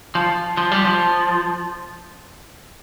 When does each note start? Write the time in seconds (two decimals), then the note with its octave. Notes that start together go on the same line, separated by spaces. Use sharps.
0.15 F3
0.57 F3
0.72 G3
0.85 F3